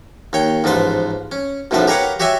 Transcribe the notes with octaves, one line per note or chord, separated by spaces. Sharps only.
D#2 C#5 G5
A1 G#2 F3 B4 C6
C#4
B1 F#2 A2 F3 B4
G4 A#4 B4 C#5 F5 F#5
F#4 G4 C#5 E5 G#5